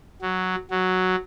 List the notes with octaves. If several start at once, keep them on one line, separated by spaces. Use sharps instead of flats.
F#3
F#3